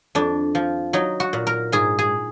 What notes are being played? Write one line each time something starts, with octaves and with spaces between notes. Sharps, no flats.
F2 D4
F3
F#3 D#4
F#4
A#2
A#4
G#2 G#4
G#4